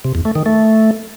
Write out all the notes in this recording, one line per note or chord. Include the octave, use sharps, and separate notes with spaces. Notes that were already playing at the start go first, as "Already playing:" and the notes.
C3
E2
A3
D#3
A3